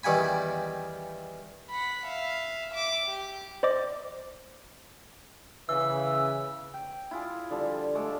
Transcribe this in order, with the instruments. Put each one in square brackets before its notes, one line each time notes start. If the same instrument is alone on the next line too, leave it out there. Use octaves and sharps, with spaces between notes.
[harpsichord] E2 D#3 G3 F#5 G#5 B5
[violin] F#5 B5
E5 F5
E5 D6
G4
[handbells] C5 D5 D#5 D6
[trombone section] C#3 [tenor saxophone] E3 [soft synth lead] E6
[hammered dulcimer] G5
E4 F4 G#4
D3 F3 G3 A5
G#3 A3 A4 D6